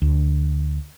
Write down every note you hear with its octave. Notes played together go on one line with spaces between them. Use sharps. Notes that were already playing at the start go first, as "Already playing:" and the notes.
D2